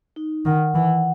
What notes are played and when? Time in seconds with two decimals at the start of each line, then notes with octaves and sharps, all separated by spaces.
0.16 D#4
0.45 D#3 F#5
0.75 E3 F#5